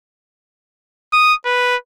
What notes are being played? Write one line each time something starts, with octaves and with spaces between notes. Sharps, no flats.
D#6
B4